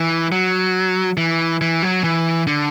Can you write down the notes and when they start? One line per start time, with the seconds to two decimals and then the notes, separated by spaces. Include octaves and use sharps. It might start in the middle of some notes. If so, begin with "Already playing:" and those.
Already playing: E3
0.32 F#3
1.17 E3
1.61 E3
1.82 F#3
2.04 E3
2.47 D3